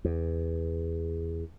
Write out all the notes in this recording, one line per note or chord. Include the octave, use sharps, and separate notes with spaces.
E2